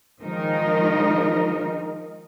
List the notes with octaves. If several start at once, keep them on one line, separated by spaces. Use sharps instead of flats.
D#3 F3 G#3 D#4 A#4 D#5